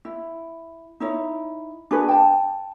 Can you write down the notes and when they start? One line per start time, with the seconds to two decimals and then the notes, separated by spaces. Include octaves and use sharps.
0.05 E4
1.00 D#4 E4 C#5
1.91 D4 F#4 G#4 B4
2.08 G5 A5